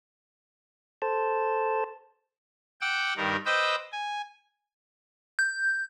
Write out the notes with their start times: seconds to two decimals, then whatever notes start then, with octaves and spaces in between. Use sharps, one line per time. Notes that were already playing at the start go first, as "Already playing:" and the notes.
1.02 A4 C5 A5
2.81 F#5 G5 D6 E6
3.17 G2 D#3 G3 A#4
3.46 B4 C5 D#5 G5 D6 E6
3.92 G#5
5.39 G6